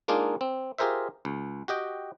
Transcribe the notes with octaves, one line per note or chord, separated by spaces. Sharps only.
G#3 A#3 D4 D#4 F4 G#4
C4
F4 G4 G#4 A#4 C5 E5
C#2
F#4 G4 D#5 G5